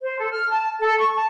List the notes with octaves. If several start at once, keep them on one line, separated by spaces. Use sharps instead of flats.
C5
A4
F6
A5
A4
C#6
A5